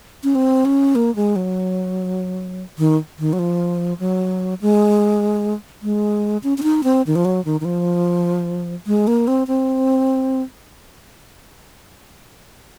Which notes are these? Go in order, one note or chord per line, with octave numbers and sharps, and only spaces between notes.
C#4
C4
C#4
A#3
G#3
F#3
D#3
D#3
F#3
F3
F#3
G#3
G#3
C#4
C#4
D#4
C4
D#3
F3
F#3
D#3
D#3
F3
G#3
A#3
C4
C4